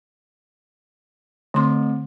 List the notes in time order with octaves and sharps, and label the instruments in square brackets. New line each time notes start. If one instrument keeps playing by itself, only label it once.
[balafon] D3 C6 [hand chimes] A3 C4